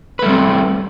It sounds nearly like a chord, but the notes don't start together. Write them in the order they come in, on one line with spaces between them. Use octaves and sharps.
B4 A3 G3 C4